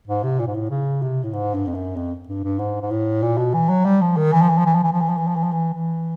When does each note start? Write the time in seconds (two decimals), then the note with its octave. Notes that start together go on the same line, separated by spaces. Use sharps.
0.07 G#2
0.23 C3
0.39 A#2
0.47 G#2
0.55 A2
0.70 C#3
1.02 C3
1.24 A2
1.33 G#2
1.54 G2
1.67 F2
1.75 F#2
1.96 F2
2.28 G2
2.44 G2
2.59 G#2
2.82 G#2
2.91 A2
3.22 A#2
3.37 B2
3.54 E3
3.69 F#3
3.85 G3
4.01 F3
4.17 D#3
4.33 E3
4.41 F3
4.49 E3
4.58 F3
4.66 E3
4.75 F3
4.83 E3
4.93 F3
5.01 E3
5.09 F3
5.18 E3
5.27 F3
5.36 E3
5.43 F3
5.52 E3
5.74 E3